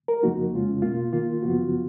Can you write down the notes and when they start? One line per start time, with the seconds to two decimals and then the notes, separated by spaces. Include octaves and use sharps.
0.08 A#4
0.23 F2 C#3 F3 A#3 D#4 F#4
0.53 F2 C#3 G#3 C#4 F4
0.82 B2 A#3 F4
1.12 D#3 A#3 F4
1.42 F#2 C#3 F3 B3 F4 F#4